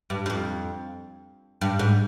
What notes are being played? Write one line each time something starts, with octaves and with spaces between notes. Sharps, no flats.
G2
G2
F2
G2
G#2